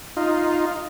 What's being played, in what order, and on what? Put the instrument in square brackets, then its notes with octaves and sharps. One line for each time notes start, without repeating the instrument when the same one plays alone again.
[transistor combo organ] D#4 F4